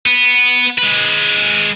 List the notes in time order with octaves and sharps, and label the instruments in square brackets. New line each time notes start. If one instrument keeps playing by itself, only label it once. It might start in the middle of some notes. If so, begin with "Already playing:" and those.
[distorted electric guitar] B3
G#3 B4